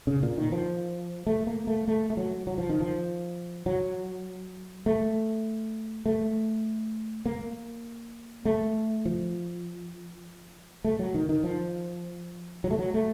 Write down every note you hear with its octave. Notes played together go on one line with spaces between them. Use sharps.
C#3
A#2
D#3
F3
A3
A#3
A3
A3
A3
F#3
F#3
F3
D#3
F3
F#3
A3
A3
A#3
A3
F3
A3
F#3
D#3
D#3
F3
F#3
A3
F#3
A3